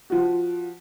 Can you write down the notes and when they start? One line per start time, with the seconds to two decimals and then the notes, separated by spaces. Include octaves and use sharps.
0.10 F3 F#4